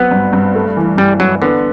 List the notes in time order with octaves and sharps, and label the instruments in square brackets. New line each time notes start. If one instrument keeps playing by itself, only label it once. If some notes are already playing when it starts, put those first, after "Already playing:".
Already playing: [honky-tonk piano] F#3 C4 [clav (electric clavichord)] B3
[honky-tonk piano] G2
G2
A3
E3
[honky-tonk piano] G2 [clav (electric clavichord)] G3
[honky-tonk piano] G2 [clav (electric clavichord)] F#3
[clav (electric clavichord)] D3 [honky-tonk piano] B3